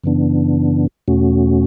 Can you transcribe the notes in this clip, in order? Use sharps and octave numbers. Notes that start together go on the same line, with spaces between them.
F#2 C#3 E3 B3 D4
E2 B2 A3 C#4 F#4